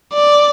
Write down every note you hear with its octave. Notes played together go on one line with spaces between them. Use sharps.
D5